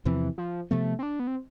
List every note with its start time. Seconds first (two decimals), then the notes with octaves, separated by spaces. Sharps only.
0.05 E2 C3 E3 F3 C4
0.38 F3
0.71 C3 F3 A3 B3
0.99 C4
1.03 D4
1.20 B3
1.27 C4